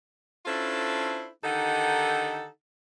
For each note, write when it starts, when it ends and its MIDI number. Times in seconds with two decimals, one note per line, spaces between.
0.46 1.29 61
0.46 1.29 62
0.46 1.29 64
0.46 1.29 65
0.46 1.29 69
0.46 1.29 72
1.43 2.47 50
1.43 2.47 51
1.43 2.47 63
1.43 2.47 67
1.43 2.47 69
1.43 2.47 78